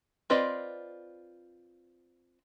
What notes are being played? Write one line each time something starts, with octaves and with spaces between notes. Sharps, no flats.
C4 F4 B4 D5 D#5